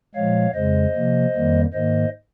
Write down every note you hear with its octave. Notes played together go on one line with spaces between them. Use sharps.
A#2 F3 G#3 C#5 F5
F2 C#3 G#3 C5 D#5
C3 F3 A#3
F2 D#3 G3 A#3
G#2 D#3 A#3 C5 D#5